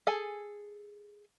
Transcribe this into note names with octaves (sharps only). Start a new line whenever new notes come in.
G#4 A4 G#5